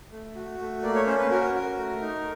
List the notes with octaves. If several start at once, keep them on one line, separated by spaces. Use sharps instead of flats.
A3
F#4
A3
A#3 D5
C#5
C#4 C5
B4
F#4 A#4
F#4
A3
D#4